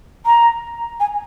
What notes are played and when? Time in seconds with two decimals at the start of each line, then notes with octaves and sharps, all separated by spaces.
0.26 A#5
1.00 G#5